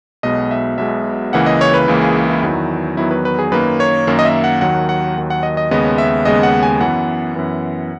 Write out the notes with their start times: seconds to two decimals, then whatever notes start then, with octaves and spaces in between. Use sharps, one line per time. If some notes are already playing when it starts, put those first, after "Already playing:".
0.23 B1 B2 G#3 B3 D#5
0.51 E5
0.78 B1 B2 G#3 B3 E5
1.33 C#2 C#3 E3 A#3 F#5
1.46 D#5
1.61 C#5
1.74 B4
1.88 C#2 C#3 E3 A#3
2.02 G#4
2.29 E4
2.43 E2 D#3 F#3 B3
2.97 E2 D#3 F#3 B3 E4
3.11 B4
3.25 B4
3.39 G#4
3.52 F#2 D#3 A#3 B4
3.80 C#5
4.07 F#2 D#3 A#3
4.19 D#5
4.25 E5
4.44 F#5
4.61 D#2 D#3 F#3 F#5
4.89 F#5
5.16 D#2 D#3 F#3
5.30 F#5
5.43 D#5
5.57 D#5
5.71 D#2 C#3 G#3 B3 D#5
5.98 E5
6.25 D#2 C#3 G#3 B3 D#5
6.43 F#5
6.63 G#5
6.80 F#2 E3 B3 F#5
7.35 F#2 E3 B3